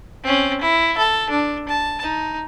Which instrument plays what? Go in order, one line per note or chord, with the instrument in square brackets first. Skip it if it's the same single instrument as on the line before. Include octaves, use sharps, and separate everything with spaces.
[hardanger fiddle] C4 C#4
E4
A4
D4
A5
D#4